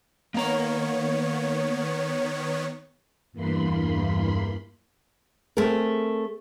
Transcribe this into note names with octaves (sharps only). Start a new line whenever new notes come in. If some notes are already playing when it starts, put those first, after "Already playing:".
D#3 A#3 B3 C#5 A#5
E2 G2 E3 A#3 B5 C6
A3 C4 G#4 A#4